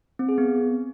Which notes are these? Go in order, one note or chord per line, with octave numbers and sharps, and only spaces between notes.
C4
G#4
B3